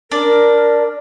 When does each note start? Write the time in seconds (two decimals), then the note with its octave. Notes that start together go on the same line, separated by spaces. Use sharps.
0.11 D4 A#4